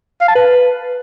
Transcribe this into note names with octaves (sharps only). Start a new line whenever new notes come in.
F5
A5
B4